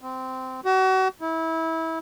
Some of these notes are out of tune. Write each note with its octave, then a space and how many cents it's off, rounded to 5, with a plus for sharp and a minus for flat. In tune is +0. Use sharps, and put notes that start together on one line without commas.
C4 -15
F#4 +35
E4 -25